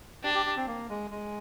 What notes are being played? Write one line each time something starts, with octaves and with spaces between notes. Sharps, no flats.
D4 G4
G4
G4
C4
A#3
G#3
G#3